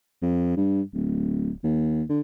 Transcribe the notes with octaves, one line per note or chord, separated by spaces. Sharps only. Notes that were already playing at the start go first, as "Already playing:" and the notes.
F2
G2
D1
D#2
D3